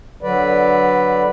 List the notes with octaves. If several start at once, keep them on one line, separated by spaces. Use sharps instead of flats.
D3 F#3 B4 D5